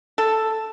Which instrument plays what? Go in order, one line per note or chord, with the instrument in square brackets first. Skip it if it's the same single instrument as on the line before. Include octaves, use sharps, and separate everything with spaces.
[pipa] A4